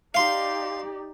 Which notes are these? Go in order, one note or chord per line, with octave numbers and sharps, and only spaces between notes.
D#4 G4 D5 F5 C6